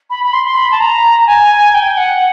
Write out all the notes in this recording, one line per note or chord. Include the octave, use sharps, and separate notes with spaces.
B5
B5
C6
C6
B5
A5
A#5
G#5
G5
F#5